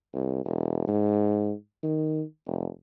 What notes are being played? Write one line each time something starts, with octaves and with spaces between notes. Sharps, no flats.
C2
E1
G#2
D#3
F1